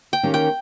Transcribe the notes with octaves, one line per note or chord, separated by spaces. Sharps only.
G5
D#3 A#3 C#4 G4
G5